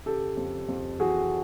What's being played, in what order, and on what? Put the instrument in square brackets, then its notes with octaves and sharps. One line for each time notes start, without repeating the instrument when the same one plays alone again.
[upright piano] C#3 G4 A4
F2
F2
E3 F#4 G#4